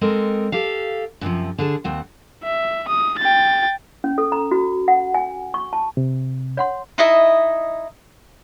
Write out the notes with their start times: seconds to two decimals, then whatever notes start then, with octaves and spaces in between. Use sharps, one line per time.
0.01 G#3 C4 A4 A#4 D#5
0.52 G4 A4 F5
1.21 F#2 C3 E3 F3
1.58 D3 G#4 A5
1.84 D#2 C4 F#5
2.44 E5
2.88 D#6
3.19 G5 A6
4.04 C#4
4.18 A4
4.32 A#5
4.51 F#4
4.88 F#5
5.14 G#5
5.54 C#6
5.73 A5
5.97 C3
6.57 C#5 F#5 C6
6.98 D#4 E4 D#5 E5